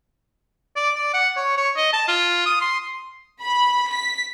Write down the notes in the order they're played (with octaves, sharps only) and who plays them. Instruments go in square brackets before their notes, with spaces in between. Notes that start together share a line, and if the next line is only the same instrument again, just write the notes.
[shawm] D5
D5
F#5
C#5
C#5
D#5
A5
F4
D#6
C6
[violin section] B5
B6